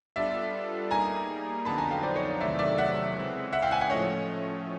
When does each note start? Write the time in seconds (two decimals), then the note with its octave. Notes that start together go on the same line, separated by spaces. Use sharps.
0.16 G3 B3 D4 F4 A4 D5 E5
0.91 G3 A#3 D#4 G#4 G#5 A#5
1.65 F2 D3 F#3 B3 D#4 A5 B5
1.78 G#5 A#5
1.91 F5 G5
2.03 C5 D5
2.16 C#5 D#5
2.40 E2 C3 D#3 F#3 A3 D5 E5
2.59 D5 E5
2.78 E5 F#5
3.16 C#3 E3 G#3 C4
3.53 E5 F#5
3.62 F5 G5
3.71 F#5 G#5
3.81 F#5 G#5
3.90 A2 F3 A3 C#4 C#5 D#5